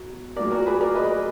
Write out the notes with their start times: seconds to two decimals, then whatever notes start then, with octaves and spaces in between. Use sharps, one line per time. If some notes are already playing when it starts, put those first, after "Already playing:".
Already playing: B2 F#3
0.36 A#2 F#3 A#4 D5
0.51 F#4 A#4
0.66 G#4 B4
0.81 A#4 D5
0.95 B4 D#5